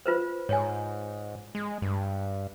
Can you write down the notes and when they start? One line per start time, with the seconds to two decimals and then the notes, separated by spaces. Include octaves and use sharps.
0.06 F4 B4 C5
0.49 G#2 C#5 G#5
1.55 G#3
1.82 G2